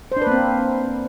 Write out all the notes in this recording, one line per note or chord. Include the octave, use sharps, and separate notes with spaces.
C5
D4
B4
A#3
C4